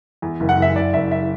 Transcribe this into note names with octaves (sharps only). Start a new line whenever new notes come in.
E2
F#1
F#5
F#1 E5
F#1 D5
F#1 E5
E5